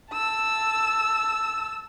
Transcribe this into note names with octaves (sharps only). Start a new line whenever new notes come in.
A5 E6